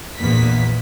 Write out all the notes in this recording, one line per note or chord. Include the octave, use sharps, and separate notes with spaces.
A#1 E2 A#3 B3 B6